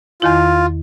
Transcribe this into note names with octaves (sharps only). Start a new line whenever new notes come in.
E2 D#3 E4 F4